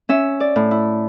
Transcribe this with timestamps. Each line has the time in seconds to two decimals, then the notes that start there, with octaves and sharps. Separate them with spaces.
0.09 C#4 E5
0.40 D5
0.56 A2
0.71 E4